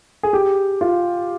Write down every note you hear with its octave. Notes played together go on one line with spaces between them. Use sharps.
G#4
G4
F4